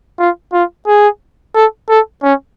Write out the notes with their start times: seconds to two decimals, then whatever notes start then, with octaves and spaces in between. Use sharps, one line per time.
0.19 F4
0.53 F4
0.87 G#4
1.55 A4
1.89 A4
2.23 C#4